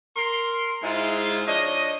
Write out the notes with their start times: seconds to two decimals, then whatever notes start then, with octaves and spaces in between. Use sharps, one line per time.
0.16 A#4 C6
0.82 G#2 G#3 E4 F4 G#4 C5
1.46 F3 D4 C#5 D#5